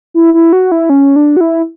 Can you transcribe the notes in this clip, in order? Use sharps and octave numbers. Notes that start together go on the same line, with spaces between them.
E4
E4
F#4
E4
C#4
D4
F#4
E4